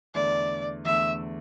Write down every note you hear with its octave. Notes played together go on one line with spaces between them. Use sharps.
E2 D3 A3 D5
E2 D3 A3 E5